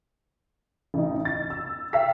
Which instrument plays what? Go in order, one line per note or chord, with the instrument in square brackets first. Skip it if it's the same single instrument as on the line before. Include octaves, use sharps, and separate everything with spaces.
[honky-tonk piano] A1 D#4
A6
E6
E5 F5 G5 E6 B6